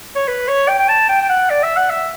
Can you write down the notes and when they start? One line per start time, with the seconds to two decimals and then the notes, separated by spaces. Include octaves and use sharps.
0.16 C#5
0.28 B4
0.48 C#5
0.68 G5
0.79 G5
0.88 A5
1.09 G5
1.22 G5
1.29 F#5
1.50 D5
1.63 E5
1.77 F#5
1.90 E5